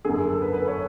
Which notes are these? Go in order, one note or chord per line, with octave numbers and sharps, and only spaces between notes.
F#2 D3 G#4
G#4
A4
B4
B4
C#5